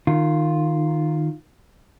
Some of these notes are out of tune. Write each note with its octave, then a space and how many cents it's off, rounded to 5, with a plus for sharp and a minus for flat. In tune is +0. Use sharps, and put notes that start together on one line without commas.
D#3 -15 F4 +0